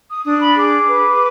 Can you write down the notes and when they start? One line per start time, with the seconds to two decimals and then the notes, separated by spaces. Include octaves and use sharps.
0.09 D#6
0.25 D4 D#6
0.40 B5
0.56 G#4 D6
0.88 B4